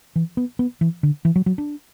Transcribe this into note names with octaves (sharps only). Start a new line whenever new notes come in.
E3
B3
B3
E3
D3
E3
F#3
F#3
D4